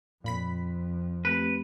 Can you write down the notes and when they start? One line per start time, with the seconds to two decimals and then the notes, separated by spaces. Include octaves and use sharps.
0.24 F2 A#2 B5 B6
1.25 A3 C4 G4 B4